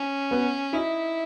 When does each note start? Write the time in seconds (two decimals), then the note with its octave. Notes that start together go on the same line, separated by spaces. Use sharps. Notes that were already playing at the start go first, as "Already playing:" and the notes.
Already playing: C#4
0.31 B3
0.73 D#4 E4